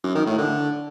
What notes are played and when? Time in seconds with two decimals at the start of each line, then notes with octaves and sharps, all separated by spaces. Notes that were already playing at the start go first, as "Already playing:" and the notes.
0.04 F#2
0.15 D#3
0.27 A2
0.38 D3